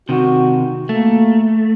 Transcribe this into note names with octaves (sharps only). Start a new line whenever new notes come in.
C3 D#3 F#4
A3 A#3